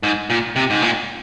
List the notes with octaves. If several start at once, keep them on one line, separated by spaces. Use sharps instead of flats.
G#2
A#2
C3
G#2
A#2